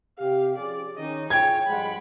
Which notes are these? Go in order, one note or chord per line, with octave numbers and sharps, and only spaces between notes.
C3 G4 F5
F3 C#4 G#4 D5
D#3 C#4 D#4 D#5
E4 F4 G#4 C#5 G5 G#6
G2 F3 G#3 F#5 B5